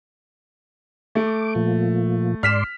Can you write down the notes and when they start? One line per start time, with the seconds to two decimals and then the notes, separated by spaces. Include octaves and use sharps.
1.15 A3 D6
1.55 A#2 F3
2.43 G#2 D5 C6 F6 B6 E7